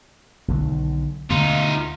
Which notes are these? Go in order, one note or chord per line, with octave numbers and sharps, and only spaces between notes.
B1 D3 D#3
D2 B2 D3 D#4 F4